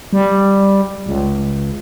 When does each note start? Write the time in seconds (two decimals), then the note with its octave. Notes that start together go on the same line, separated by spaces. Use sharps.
0.13 G3
1.06 C#2